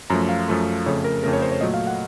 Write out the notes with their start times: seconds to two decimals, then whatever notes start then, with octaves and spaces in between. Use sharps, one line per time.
0.10 F#2 F3 A3 A#5
0.29 F5
0.48 F#2 F3 A3
0.86 F2 C#3 A3 C#5
1.04 A#4
1.24 F2 C#3 A3 A#4
1.33 C#5
1.42 C5
1.52 C#5
1.61 A#2 F#3 A3 D#5
1.74 F5
1.87 F#5